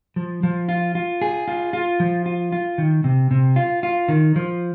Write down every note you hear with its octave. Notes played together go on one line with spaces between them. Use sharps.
F3
F3
F4
F4
G#4
F4
F4
F3
F4
F4
D#3
C3
C3
F4
F4
D#3
F3